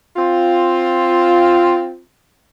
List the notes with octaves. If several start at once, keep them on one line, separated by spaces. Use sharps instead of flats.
C4 F4